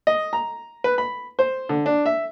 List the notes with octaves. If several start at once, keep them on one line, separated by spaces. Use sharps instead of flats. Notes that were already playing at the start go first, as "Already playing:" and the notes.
D#5
A#5
B4
B5
C5
D3
D4
E5